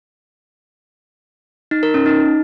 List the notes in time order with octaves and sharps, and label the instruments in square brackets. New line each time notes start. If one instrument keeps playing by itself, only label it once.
[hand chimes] D#4
A#4
C#4
D#4